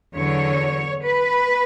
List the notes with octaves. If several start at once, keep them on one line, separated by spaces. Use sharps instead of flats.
E2 D3 F#3 C#5
B4